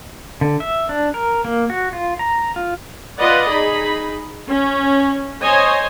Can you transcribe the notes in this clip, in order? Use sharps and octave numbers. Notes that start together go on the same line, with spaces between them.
D3
E5
D4
A#4
A#3
F#4
F4
A#5
F4
F4 B4 D5 D#5 F#5
D#4 G#4 B5
C#4
C5 C#5 D#5 G#5